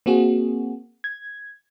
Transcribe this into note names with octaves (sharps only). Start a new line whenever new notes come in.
A#3 C4 F#4 G#4
G#6